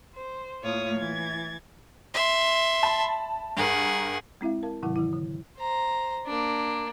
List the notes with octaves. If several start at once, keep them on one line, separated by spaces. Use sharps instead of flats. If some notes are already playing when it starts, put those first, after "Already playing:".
C5
A2 A3 A#3 F4 C#5 D#6
E3 G#6 A6
E5 C6
A5 B5
G2 G#4 A#4 F#5
G#3 C4 E4 E5 F5
A#4 F5 A5
G#2 C3 D#3 F#3 E4 F#5
D#3 E3 E4
D3
C5 A#5
A#3 D4